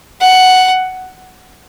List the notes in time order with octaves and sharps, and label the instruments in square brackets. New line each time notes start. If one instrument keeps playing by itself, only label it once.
[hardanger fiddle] F#5